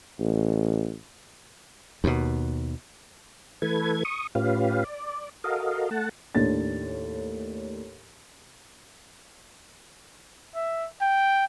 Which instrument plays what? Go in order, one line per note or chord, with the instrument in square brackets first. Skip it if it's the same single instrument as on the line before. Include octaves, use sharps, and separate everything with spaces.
[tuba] A1
[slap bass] D#2 B2
[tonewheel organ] E3 A3 A4 B4 G#6
C#6 D#6
A2 C#4 F4 G4 B4 F5
D5
F#4 A4 A#4 D#5 F5
A3 F#5 A5
[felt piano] D#2 A2 D4 A6
[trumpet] E5
G5